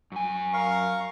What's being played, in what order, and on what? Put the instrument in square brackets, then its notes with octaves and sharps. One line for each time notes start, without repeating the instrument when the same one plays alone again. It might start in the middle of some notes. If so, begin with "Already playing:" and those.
[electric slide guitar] F#2 G#5
[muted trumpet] A#4 [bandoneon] F5 C#6